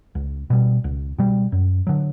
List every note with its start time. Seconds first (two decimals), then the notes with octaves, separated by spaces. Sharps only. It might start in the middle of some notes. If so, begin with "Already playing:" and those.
0.15 C#2
0.50 B2 G3
0.84 C#2
1.18 B2 G3
1.52 F#2
1.87 D3 F#3